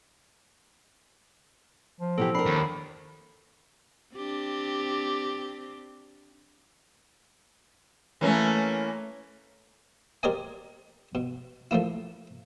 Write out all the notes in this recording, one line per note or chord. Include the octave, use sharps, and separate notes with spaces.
F3
B2 E3 G4 A4
D4 A#4 B5 C7
D#2
C4 D4 G4
E3 A3 A#3 C#4
G4 A#4 C5 D5 D#5 G#5
B2
F3 A3 A#3 E4